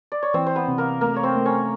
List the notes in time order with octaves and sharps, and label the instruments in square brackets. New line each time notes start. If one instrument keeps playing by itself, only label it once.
[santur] D5
C#5
[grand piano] E3 [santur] C4 C5
[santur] C5
B3 B4
[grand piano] C3
[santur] A#3 A#4
[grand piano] A3 [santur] A#3 A#4
[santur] C#5
C4 C5
[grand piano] A3
[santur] C#4 C#5